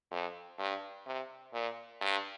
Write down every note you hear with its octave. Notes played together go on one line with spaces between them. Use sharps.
F2
G2
C3
A#2
G2